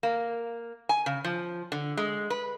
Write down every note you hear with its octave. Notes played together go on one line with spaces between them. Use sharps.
A#3
G#5
C#3
F3
D3
G#3
B4